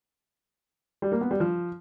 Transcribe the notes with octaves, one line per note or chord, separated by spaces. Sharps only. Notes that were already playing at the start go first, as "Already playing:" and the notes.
G3
A#3
B3
G3
F3